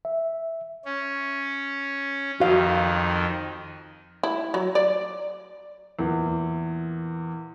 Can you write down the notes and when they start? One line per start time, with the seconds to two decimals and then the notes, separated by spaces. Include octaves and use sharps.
0.05 E5
0.85 C#4
2.40 F2 D#3 F#4 F5
4.23 E4
4.54 F#3
4.75 D5
5.99 E2 A#2 E3